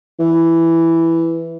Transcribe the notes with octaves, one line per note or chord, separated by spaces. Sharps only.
E3